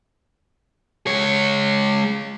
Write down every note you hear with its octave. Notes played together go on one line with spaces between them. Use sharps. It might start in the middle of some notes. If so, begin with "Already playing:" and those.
G#3 C#5